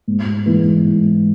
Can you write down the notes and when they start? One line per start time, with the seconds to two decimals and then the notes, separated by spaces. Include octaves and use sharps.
0.08 G#2
0.46 E3 G#3 B3
0.84 G#2